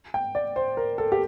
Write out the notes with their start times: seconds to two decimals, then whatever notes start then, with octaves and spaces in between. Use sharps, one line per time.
0.14 G5
0.35 D5
0.56 C5
0.77 A#4
0.98 A4
1.12 G4